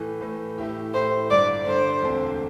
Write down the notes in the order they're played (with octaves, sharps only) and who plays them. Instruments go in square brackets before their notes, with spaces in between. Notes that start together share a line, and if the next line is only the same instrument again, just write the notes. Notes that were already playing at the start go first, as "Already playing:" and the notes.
Already playing: [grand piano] A2 E3 A3
A2 E3 A3
A2 A3 E4 G4
[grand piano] A2 A3 E4 G4 [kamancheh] C5
[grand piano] G1 G2 D3 [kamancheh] D5
[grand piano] G1 G2 D3 [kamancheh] C5
[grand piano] E1 D2 D3 C4 A4